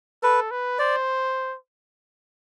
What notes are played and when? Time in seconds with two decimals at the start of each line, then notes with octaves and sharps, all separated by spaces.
0.23 A4 B4
0.51 B4
0.79 C5 D5